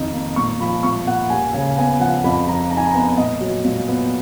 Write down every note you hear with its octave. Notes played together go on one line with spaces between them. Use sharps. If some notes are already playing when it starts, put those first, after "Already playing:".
Already playing: F2 D#3 D#4
A#3
A#2 C#6
F3 B5
A#2 C#6
A#3 F#5
D#2 G#5
C#3 G#5
B3 G#5
F3 F#5
F2 B5
F3 A#5
D#4 A#5
G#5
A#5
B3
A#2 D#5
F#3
A#2
B3